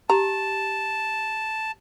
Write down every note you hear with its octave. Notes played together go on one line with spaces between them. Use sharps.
G4 A5 A#5